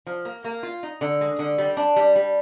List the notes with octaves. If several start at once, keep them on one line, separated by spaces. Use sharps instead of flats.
F3
A#3
A#3
F4
D#4
D3
G#3
D3
G3
D4
G3
G3